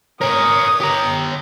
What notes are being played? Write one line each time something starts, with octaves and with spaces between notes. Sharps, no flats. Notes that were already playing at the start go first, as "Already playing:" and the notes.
A#4 C#5 G#5 D#6
G4 A#5